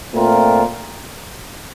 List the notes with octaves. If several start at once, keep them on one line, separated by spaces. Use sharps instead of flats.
A#2 A3 C4 F4 A#4